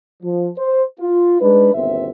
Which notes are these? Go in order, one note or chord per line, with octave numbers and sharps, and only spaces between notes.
F3
C5
F4
G#3 D4 D#4 B4
G1 D#2 B2 C4 E5